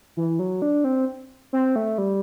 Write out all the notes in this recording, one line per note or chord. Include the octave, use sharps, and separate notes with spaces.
E3
F#3
D4
C4
C4
A3
G3